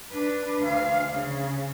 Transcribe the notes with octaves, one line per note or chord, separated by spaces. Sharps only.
D4 B4
D2 F5
C#3